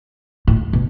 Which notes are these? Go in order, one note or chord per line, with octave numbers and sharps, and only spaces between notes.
A2
B2